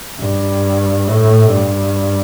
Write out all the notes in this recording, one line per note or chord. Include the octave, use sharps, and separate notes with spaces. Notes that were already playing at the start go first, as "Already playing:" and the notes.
G2
A2
G2